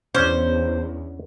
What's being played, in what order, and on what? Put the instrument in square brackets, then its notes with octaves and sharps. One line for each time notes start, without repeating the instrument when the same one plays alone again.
[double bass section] E2 [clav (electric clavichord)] C#4 D4 [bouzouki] C5